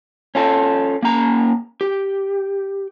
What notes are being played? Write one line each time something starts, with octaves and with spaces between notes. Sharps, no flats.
C#4 F4 A4
A#3 C#4 A#5
G4